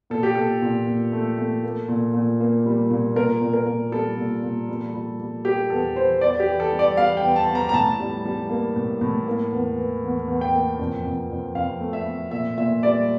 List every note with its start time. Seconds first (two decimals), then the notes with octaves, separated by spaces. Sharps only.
0.10 A#2 A4
0.23 G4
0.35 A#2 A4
0.62 A#2
0.87 A#2
1.12 A3
1.38 A3
1.63 A#3
1.88 A#2
2.14 A#2
2.40 A#3
2.66 G3
2.90 A#2
3.16 A#2 A#4
3.41 A#2
3.53 A#4
3.66 A#2
3.92 G3 A4
4.17 A#2
4.43 A#2
4.69 G3
4.94 G3
5.19 G3
5.45 A#3 G4
5.70 E2 A4
5.96 E3 C5
6.21 E2 D5
6.40 G4
6.47 E3
6.60 A4
6.72 G3
6.79 D5
6.97 G3 F5
7.17 G5
7.23 E2
7.36 A5
7.49 E2
7.55 A#5
7.69 A#5
7.73 A2 A5
7.99 G3
8.25 G3
8.50 A#3
8.76 A2
9.01 A2
9.27 A#3
9.52 E2
9.77 E3
10.03 E2
10.28 E2
10.41 G5
10.54 A#3
10.79 F2
11.04 F2
11.30 F2
11.55 F2 F5
11.80 A3
11.93 E5
12.07 A3
12.31 A#2 E5
12.58 A#2 E5
12.83 G3 D5